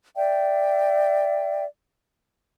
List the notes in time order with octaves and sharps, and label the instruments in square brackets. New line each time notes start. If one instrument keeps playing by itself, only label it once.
[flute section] D5 E5 G5